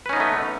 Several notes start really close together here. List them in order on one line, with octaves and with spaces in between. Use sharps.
B4 C#4 D#4 B3 A3